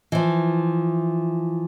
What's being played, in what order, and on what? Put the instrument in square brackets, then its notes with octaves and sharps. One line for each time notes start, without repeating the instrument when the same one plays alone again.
[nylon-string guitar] E3 F3